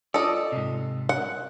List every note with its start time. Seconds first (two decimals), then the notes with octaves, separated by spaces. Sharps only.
0.14 F4 A4 D5 D#5
0.52 G#2 C3
1.09 F#5